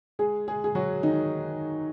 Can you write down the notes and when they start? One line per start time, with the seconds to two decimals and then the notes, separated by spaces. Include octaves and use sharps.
0.19 G#3 G#4
0.48 G#3 G#4
0.64 G#4
0.75 F#3 F#4
1.03 D#3 D#4